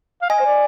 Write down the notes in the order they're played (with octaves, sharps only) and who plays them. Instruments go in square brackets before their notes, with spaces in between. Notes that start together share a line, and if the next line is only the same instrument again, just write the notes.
[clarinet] F5
[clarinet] D#5 [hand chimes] G#5
[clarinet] C5
D5